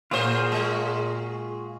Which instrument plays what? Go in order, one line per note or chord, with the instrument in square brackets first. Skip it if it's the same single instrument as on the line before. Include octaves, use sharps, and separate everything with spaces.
[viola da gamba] A#2 [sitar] A#3 C5 [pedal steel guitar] F4 F#4 G#4
[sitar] G#3